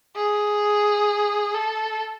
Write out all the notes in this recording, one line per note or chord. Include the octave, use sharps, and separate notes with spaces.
G#4
A4